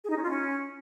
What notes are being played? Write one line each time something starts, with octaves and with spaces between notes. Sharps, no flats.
G#4
D#4
C#4
F4
C#4